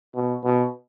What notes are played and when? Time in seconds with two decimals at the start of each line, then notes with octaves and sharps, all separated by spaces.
0.15 B2
0.44 B2